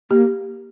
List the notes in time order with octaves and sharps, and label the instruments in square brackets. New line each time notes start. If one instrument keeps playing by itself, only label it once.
[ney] A#3 [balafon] G4